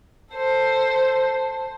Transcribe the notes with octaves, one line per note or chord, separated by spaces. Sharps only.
A4 C5